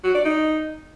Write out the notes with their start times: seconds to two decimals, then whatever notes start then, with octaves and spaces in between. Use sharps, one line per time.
0.04 F#4
0.14 D5
0.25 D#4